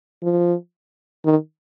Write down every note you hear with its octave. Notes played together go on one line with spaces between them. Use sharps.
F3
D#3